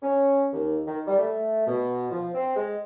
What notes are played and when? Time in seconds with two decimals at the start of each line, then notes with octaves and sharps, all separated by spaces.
0.02 C#4
0.53 D#2
0.87 D#3
1.07 G3
1.19 A3
1.67 B2
2.11 F3
2.34 C4
2.56 G#3